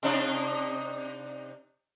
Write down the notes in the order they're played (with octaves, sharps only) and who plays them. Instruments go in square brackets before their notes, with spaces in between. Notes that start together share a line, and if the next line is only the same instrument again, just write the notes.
[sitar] C3 D4 D#4